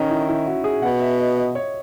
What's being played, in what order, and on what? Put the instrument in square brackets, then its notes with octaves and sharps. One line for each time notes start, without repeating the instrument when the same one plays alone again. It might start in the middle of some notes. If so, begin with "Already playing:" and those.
Already playing: [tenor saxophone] D#3 [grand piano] C#4 D#4
[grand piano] E4
E4
F#4
G#4
[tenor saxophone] B2 [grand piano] F#5
[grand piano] E5
D#5
D#5
C#5